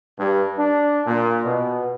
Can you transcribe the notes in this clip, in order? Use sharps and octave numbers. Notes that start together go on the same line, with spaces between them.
G2
D4
A#2
B2